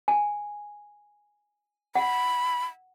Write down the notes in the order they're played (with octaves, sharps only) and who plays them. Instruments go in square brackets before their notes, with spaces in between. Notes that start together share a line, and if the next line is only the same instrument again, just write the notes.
[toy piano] G#5
[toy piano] F#5 [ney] B5